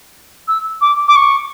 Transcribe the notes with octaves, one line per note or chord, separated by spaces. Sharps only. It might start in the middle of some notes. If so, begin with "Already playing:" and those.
E6
D6
D6
C#6